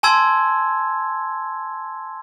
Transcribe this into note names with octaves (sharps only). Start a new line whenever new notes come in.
G#5 A5 C6 E6 G#6